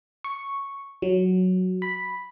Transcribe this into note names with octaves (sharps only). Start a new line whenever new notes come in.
C#6
F#3
B5